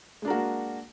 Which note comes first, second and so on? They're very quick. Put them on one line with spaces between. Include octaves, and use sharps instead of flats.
G#3 D4 A#4 F#4 A#3